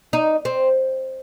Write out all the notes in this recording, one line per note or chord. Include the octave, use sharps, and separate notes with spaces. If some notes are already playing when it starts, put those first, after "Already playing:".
D#4
C4